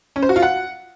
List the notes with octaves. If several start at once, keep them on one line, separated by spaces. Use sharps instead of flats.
C#4
C5
F#4
F4
F#5